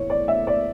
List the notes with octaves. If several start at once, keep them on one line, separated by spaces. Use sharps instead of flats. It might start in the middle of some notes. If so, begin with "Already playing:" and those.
Already playing: A2 E3 C#5
D5
E5
D5